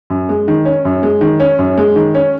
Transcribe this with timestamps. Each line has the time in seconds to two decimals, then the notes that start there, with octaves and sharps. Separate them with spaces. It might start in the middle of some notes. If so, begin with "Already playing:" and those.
0.10 F#2
0.29 G#3
0.48 D#3
0.65 C#4
0.85 F#2
1.03 G#3
1.21 D#3
1.40 C#4
1.59 F#2
1.77 G#3
1.96 D#3
2.14 C#4